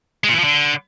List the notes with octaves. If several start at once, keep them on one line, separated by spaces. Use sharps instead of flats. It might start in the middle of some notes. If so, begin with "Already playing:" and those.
G#3
A#2
E3
F3
D3